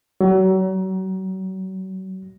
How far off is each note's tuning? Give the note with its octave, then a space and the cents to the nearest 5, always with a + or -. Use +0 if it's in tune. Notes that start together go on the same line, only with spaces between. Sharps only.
F#3 +35